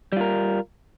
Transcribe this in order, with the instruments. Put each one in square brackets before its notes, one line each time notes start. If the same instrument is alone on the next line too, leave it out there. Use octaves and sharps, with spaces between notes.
[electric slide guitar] G3
F4
A#4